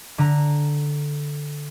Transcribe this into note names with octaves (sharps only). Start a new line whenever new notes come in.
D3 A#5